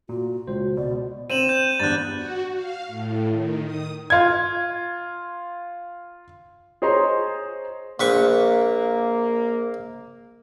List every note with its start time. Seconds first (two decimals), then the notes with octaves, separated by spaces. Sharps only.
0.09 A#2 F#4
0.48 C#2 C5
0.77 B2 D5
1.30 C4 D#7 E7 F#7
1.49 G6
1.80 E2 G2 F#6 A6
2.14 F#4
2.53 F5
2.87 A2
3.28 D#3
3.65 D#6
4.10 F4 G#6
6.82 G#4 C5 C#5 D#5 A#5 C6
8.00 A#1 A#3 B4 C#6